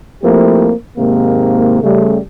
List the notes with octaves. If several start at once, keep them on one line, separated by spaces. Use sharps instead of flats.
F3 A3 A#3 C4 E4 G4
G#2 C3 D#3 A#3
C#3 G3 A3